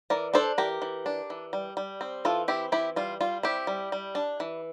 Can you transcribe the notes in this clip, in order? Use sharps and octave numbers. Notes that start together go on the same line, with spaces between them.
E3 A#4 D5
D4 A4 C5
E3 G4 A#4
E3
D4
E3
G3
G3
C4
E3 F4 A4
C4 E4 G4
E3 E4 G4
G3 F4
G3 F4
C4 E4 G4
G3
G3
D4
E3